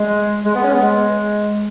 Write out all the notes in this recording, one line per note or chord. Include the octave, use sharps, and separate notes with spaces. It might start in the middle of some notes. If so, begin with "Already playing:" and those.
Already playing: G#3
G#3
B3
C#4
B3
G#3